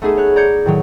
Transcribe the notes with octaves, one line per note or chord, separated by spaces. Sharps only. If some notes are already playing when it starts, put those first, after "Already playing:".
A3 B3 D#4 G#4 A4
C#5 F#6
D5 A#5 G6 G#6 C#7
A2 D#3 F#3